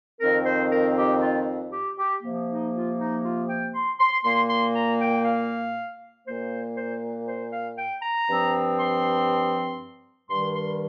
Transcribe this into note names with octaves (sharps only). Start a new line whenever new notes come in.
F2 D#3 C4 A#4
C5
A#4
G4
F4
G4
G4
C3 F3 A#3
D#4
F4
D#4
F4
G5
C6
C6
A#2 A#3 C6
C6
A#5
G5
F5
A#2 A#3 C5
C5
C5
F5
G5
A#5
G2 F3 C4
C6
G2 D#3 G3 C6
C6